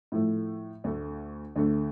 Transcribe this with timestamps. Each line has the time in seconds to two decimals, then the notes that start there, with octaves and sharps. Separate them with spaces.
0.12 A2 F3 A3
0.84 D2 D3 A3
1.56 D2 D3 A3